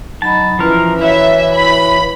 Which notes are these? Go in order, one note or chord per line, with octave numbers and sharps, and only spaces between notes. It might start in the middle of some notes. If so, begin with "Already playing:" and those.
F#3 D#4 A5 B5
E3 F3 C#4 E4 A#4 B4
E4 F#4 C#5 E5 F5
B5